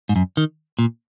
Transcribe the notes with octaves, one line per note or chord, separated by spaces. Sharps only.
G#2
F#2
D#3
A#2